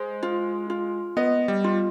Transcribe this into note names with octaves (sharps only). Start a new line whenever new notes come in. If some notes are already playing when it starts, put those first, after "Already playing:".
Already playing: G#3 C5
F4
F4
B3 D#5
G3
F4